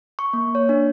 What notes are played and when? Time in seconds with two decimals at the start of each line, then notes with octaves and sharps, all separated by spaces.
0.19 C#6
0.33 A#3
0.55 C#5
0.69 D4